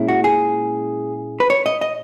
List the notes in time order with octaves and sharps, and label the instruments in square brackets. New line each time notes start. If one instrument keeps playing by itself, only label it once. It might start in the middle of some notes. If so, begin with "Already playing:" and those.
Already playing: [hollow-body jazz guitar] A#2 G#3 C#4 E4
F#4
G#4
B4
C#5
D#5
D#5